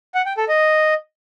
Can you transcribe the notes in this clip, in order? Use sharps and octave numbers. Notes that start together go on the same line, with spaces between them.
F#5
G5
A4
D#5